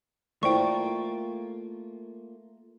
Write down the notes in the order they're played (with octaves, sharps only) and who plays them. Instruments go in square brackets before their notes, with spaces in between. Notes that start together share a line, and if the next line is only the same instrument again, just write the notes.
[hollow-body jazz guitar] A3 [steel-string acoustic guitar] A#3 F4 [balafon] E4 C5 D5 [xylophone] G5 C#6